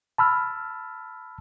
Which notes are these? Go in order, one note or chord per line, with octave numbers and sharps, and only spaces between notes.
A5 B5 E6 F6